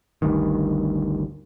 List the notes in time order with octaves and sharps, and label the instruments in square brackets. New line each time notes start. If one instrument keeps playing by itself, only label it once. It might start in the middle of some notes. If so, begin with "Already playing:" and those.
[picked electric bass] G1 D2 G2 D#3